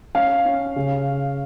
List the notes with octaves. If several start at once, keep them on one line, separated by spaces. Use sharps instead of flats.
C#4 F5
C#4
C#3